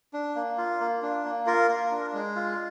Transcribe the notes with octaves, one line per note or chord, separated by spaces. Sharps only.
D4
A#3
F4
A#3
D4
A#3
F4 A#4
A#3
D4
G#3
F4